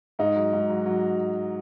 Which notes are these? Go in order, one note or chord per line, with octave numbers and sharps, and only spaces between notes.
G#2 D#4
F#3
G#2
F#3
F#3